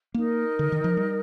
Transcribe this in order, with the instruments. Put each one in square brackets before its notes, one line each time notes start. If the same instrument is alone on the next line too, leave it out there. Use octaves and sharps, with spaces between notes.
[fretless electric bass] A#3 [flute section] D#4 A#4 D#5
[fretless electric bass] D3
D#3
F3
G3